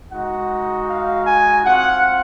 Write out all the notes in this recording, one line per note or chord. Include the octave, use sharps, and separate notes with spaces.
G#3 D#4 F#4 F#5
F5
G#5
C4 F4 F#5